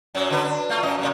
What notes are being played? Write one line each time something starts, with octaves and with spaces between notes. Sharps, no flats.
F#2 F#3
D3 B4
D4
A3 F4
F#2 D#5
A#2 C#3 F#3